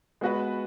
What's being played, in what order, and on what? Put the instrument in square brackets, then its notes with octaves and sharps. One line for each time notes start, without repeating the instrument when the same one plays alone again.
[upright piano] G#3 B3 F#4 B4